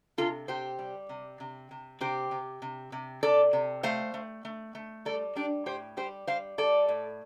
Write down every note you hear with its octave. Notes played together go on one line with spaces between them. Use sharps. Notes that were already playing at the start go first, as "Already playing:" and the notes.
C3 F4 A4
C3 G4 C5
G3
C3
C3
C3
C3 G4 C5
C3
C3
C3
C3 A4 D5
C3
A3 C5 F5
A3
A3
A3
G3 A4 D5
G3 D4 G4
A2 G4 C5
G3 G4 C5
G3 C5 F5
G3 A4 D5
A2